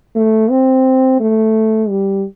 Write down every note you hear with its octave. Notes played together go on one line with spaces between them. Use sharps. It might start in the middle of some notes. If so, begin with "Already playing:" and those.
A3
C4
A3
G3